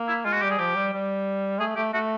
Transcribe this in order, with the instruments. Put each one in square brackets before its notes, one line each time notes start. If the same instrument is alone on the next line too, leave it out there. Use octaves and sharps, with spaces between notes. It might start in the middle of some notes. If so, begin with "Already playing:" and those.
Already playing: [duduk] A#3
[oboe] E4
[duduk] G#3 [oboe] F4
[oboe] F#4
[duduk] G3 [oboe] G4
[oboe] G#4
[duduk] F3 [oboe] G4
[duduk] G3
G3
[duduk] A3 [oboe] G#4
[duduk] A3 [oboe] G4
[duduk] A3 [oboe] F#4